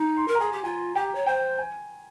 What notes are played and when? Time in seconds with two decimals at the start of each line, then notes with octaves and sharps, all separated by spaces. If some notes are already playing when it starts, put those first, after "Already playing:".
Already playing: D#4
0.17 C6
0.28 A#4
0.35 A#5
0.40 G#4 G#5
0.52 G4
0.64 F4 G#5
0.95 G4 G5
1.15 C#5
1.26 C5 G5
1.58 G#5